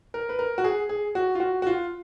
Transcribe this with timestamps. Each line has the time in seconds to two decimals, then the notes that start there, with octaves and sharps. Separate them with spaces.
0.14 A#4
0.29 B4
0.39 A#4
0.58 F#4
0.64 G#4
0.89 G#4
1.15 F#4
1.35 F4
1.40 F#4
1.62 F#4
1.66 F4